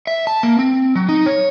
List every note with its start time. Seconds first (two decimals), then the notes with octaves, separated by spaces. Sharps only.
0.07 E5
0.27 A5
0.43 A#3
0.59 C4
0.96 F#3
1.09 D#4
1.26 C#5